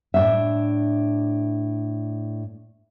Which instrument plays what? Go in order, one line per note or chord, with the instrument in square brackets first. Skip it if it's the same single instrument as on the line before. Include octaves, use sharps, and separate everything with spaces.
[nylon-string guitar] A2 D4 E5